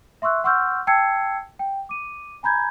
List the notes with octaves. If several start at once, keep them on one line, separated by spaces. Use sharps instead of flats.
E5 C6 C#6 E6 F#6
F#5 C6 C#6 E6 F6 G6
G5 A5 E6 G#6 C7 C#7
G5
D6 D#7
G#5 A#5 B5 G6 G#6